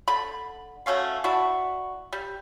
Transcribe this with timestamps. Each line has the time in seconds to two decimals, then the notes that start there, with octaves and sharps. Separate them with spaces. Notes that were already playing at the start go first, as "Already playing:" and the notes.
0.08 D3 B5
0.86 F#3 A3 C#4 F5
1.24 D4 E4 F#4
2.13 G3